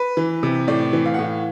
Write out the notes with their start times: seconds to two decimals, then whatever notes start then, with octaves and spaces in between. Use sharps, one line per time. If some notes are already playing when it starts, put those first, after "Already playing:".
Already playing: B4
0.17 E3
0.43 C3
0.68 A2 D5
0.93 E3
1.06 F5
1.14 F#5
1.19 A2 F5